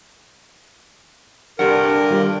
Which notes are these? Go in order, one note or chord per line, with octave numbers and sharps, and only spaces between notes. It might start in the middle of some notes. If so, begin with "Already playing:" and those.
C2 G2 D3 G4 A#4 F#5
G3 F4 G4